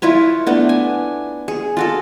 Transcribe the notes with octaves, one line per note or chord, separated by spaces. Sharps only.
E4 F4 B4 C#5
A3 B3 D4
G#5
G#4
F4 F#4 A4